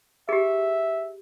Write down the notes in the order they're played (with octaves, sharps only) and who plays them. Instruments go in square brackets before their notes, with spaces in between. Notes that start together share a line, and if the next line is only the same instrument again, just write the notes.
[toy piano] G4 G#4 [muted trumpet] E5